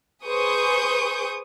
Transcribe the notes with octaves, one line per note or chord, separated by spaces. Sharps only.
G#4 B4 C5 C#6 D#6 G6